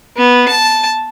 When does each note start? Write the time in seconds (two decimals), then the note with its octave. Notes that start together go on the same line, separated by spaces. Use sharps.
0.17 B3
0.48 A5